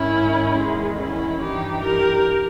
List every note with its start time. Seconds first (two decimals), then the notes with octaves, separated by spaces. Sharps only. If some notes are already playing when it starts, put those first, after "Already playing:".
Already playing: G#2 D#3 C#4 E4
0.58 E2 D#3 G#3
1.00 C#4 E4
1.41 G2 E3 D#4 G4
1.82 G4 A#4